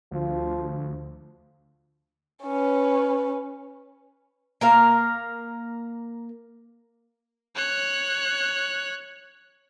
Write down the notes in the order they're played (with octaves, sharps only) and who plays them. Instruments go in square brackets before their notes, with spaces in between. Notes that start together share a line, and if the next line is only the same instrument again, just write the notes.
[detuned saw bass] D2 [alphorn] F3
[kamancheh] C#4 B4
[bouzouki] A#3 A#4 F5
[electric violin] C#5 F#6